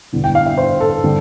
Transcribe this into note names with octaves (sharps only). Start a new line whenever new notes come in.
E1 E2 D3 G3
G5
F5
E5
C5
A4
D3 G3